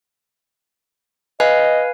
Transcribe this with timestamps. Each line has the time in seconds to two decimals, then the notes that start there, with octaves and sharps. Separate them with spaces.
1.40 B4 D#5 F5 G#5